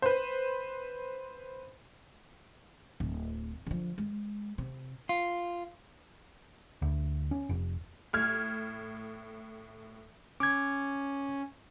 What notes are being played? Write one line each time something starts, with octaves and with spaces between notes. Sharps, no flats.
B4 C5
D1
D3 F3
G#3
C3
F4
D2
C#4
F1
A2 F6 G#6
C#4 D6 G#6